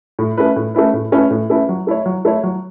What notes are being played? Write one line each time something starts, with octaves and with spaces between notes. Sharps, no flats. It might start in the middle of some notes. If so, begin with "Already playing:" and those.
A2
A3 C#4 E4 B4
A2
A3 C#4 E4 B4
A2
A3 C#4 E4 B4
A2
A3 C#4 E4 B4
F#3
A3 E4 C#5
F#3
A3 E4 C#5
F#3